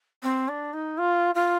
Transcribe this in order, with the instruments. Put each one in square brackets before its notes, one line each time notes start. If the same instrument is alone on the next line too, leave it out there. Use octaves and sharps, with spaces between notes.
[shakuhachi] C4
D4
D#4
F4
F4